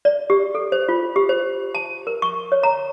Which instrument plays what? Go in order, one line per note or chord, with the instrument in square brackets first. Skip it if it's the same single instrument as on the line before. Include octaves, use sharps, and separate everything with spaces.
[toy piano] D5
G4
A4
C5
F4
G4
C5
A5
A#4
C#6
C#5
A#5